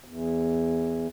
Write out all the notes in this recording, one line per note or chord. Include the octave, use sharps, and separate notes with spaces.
E2